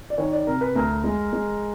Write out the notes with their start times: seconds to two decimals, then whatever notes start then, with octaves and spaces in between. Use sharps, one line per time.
0.10 D5
0.18 D#3 C#5
0.32 D5
0.47 C3 A#4
0.61 B4
0.75 D2 A#4
1.04 G#3
1.33 G#3